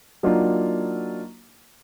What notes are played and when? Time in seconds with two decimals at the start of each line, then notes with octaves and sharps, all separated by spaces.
0.23 F#3 A#3 D4 D#4 F4